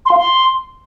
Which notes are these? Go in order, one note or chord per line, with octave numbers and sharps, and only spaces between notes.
C6
F5
C6